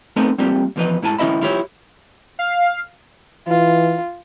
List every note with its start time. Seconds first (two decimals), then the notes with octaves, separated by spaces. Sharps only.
0.16 A3 B3 C4 D#4 A#4 G#5
0.38 G3 A#3 C4 F4 G4
0.76 E2 F3 B4 D#5
1.02 G#2 E4 G#5 A5
1.19 D#3 C#4 E4 D#5 E5 B5
1.41 E4 F4 G4 C#5
2.39 F5
3.48 E3 F4